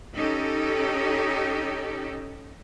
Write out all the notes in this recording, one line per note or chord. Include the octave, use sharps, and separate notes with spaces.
C#4 D#4 G4 A4